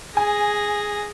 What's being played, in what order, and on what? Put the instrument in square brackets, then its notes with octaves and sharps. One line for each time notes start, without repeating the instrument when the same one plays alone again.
[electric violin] G#4 A#6 [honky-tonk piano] G#5